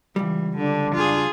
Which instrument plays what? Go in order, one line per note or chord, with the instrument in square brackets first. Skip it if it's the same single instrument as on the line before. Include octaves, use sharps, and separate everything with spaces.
[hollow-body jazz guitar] C#2 G3 [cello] E3
[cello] D3 [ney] D4
[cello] F4 G#4